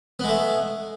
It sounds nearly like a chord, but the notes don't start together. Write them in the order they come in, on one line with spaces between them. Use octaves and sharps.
B3 G#3 A3